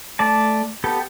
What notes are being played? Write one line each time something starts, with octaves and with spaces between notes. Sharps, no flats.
A3 D5 A5
B3 G4 A4